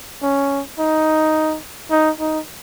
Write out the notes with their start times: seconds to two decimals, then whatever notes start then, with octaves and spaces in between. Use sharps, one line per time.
0.22 C#4
0.79 D#4
1.91 D#4
2.19 D#4